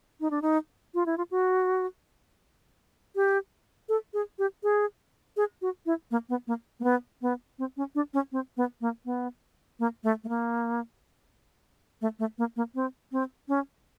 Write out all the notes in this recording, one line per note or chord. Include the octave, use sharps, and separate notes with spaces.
D#4
D4
D#4
F4
E4
F4
F#4
G4
A4
G#4
G4
G#4
G#4
F#4
E4
A#3
B3
A#3
A#3
B3
B3
C4
C#4
D4
C#4
C4
B3
A#3
B3
A#3
A3
A3
A#3
A3
A3
A#3
A#3
C4
C4
C#4